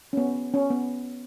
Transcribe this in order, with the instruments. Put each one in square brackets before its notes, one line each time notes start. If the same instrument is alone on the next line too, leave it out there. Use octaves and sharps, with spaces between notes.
[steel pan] C#4
B3
C#4
B3